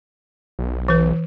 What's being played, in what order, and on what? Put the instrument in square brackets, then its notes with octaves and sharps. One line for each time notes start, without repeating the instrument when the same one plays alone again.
[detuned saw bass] B1
[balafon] E3 B4